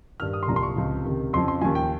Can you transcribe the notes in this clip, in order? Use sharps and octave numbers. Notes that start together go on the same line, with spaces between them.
G2 D#3 F6
D#6
C6
C2 A#2 F3 A#5
C6
C#6
C#2 C3 F3
C#2 C3 D#3
F2 C#3 F3 C6
C6
D#2 C#3 F3 G#5
G5